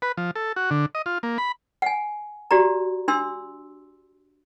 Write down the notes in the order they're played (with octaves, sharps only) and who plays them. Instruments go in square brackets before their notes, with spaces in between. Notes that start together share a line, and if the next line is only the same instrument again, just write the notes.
[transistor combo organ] B4
F3
A4
F#4
D3
D#5
F4
A#3
B5
[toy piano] F#5 G#5
F#4 G4 D5 A#5
D4 C6 E6